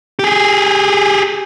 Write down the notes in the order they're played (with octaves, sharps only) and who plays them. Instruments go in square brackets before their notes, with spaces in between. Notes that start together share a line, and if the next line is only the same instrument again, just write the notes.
[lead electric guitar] G4 G#4